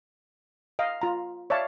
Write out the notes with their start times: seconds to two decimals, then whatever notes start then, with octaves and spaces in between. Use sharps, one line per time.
0.79 D#5 F5
1.02 F4 A#5
1.50 C#5 D5 E5 F5 A5